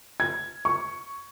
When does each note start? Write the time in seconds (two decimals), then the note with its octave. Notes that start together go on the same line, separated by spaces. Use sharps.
0.20 G#6
0.65 C#6